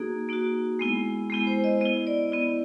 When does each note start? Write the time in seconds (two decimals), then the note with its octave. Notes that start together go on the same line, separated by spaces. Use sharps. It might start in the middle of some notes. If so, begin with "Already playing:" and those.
Already playing: A#3 D#4 F#4 G#4
0.29 A#3 D#4 F#4
0.79 G#3 B3 E4
1.30 G#3 B3 E4
1.47 C5
1.64 D#5
1.81 B3 E4 D#5
2.07 D5
2.32 B3 E4